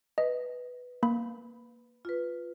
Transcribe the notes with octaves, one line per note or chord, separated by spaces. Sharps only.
B4 D#5
A#3 B5
F4 B4